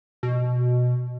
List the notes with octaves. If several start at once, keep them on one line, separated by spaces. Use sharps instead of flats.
B2